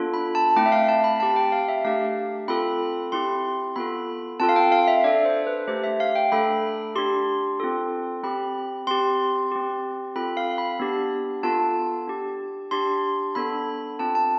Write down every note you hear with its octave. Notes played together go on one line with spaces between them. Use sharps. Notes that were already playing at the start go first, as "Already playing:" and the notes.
Already playing: B3 D4 F4 A4
B5
A5
A3 C4 E4 G5
E5
F5
A5
B5
C4 G4 A5
G5
F5
E5
A3 D4 G4 F5
C4 F4 A4 B5
C4 E4 G4 C6
B3 F4 A4 B5
C4 F4 A4 A5
F5
G5
F5
E5
D4 A4 D5
C5
B4
A3 D4 G4 C5
E5
F5
G5
A3 D4 A4 B5
D4 G4 C6
C4 F4 A4
C4 G4 B5
C4 G4 C6
C4 G4
C4 F4 A4 B5
F5
B5
B3 D4 G4
B3 F4 A4 A5
D4 G4
D4 G4 C6
B3 D4 A4 B5
C4 F4 A4 A5
A5